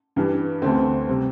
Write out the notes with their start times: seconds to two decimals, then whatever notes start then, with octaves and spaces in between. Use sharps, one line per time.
0.16 G2 E3 G3
0.62 D2 D3 A3 C4
1.09 C3 G3